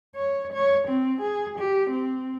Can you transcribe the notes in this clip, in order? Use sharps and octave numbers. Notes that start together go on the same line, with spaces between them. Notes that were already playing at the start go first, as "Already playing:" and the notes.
C#5
C#5
C4
G#4
G4
C4